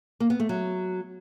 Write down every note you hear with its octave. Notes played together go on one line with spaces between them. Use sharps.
A#3
B3
A3
F#3